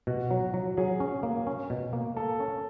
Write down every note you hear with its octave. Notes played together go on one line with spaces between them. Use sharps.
B2 F#4
F#3
F#3
F#3 G#4
C#4
A#3
C#4
B2
A#3
A#3 A4
C#4